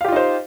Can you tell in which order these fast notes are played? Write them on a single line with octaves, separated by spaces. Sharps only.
F5 G4 F4 D#4 C5